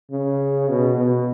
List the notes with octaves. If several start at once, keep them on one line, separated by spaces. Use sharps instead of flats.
C#3
B2
B2